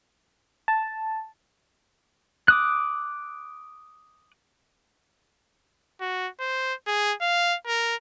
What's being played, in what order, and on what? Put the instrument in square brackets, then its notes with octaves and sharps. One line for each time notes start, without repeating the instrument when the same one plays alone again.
[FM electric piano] A5
[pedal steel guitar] D6 D#6 F#6
[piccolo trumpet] F#4
C5
G#4
F5
A#4